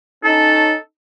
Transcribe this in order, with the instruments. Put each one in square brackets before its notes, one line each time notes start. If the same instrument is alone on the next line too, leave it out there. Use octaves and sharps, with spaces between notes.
[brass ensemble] C#4 D#4 A5 [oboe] A4